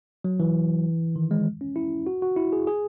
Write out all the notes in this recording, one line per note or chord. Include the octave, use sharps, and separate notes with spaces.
F#3
E3
D#3
G#3
C#4
E4
F#4
F#4
E4
G#4
G#4